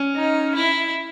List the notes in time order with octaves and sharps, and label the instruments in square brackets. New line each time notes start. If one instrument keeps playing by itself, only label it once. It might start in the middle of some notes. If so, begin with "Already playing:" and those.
Already playing: [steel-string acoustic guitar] C#4
[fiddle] D#4
E4